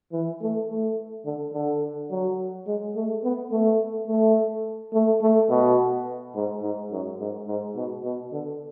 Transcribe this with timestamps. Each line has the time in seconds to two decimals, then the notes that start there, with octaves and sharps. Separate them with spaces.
0.12 E3
0.41 A3
0.69 A3
1.26 D3
1.54 D3
2.11 F#3
2.67 G#3
2.96 A3
3.24 B3
3.52 A3
4.08 A3
4.94 A3
5.21 A3
5.50 B2
6.35 G#2
6.62 G#2
6.92 F#2
7.20 G#2
7.47 G#2
7.76 B2
8.04 B2
8.32 D3